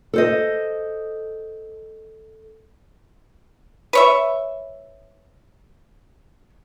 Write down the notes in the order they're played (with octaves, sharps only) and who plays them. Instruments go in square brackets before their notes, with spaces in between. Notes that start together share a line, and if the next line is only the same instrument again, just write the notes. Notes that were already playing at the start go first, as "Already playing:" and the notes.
[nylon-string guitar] A4 C5 D#5
[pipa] B4 C#5 E5